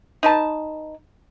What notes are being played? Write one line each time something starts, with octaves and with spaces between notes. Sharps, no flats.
D#4 B4 A5